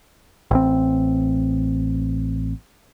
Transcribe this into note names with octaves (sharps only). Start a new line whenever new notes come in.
A1 C4